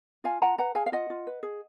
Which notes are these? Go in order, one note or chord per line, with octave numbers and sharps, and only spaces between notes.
F4 F5 G#5
F4 F#5 A#5
B4 F#5 A#5
G#4 F5 G#5
F5
F4 D#5 F#5
F4
B4
G#4